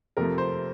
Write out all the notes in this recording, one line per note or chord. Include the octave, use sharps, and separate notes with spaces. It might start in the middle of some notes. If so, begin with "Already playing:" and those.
F2 C3 F3 A3 A#4
C5